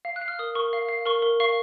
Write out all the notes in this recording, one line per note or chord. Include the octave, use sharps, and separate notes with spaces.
F5
F#6
F5
F6
A#4 D#6
A#4 C#6
F5
F5
A#4 C#6
A#4
F5 C#6